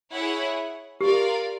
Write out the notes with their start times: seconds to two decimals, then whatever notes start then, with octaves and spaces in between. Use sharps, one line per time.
0.12 E4 G#4 C#5 F#5
1.00 F4 G4 A#4 D5 F5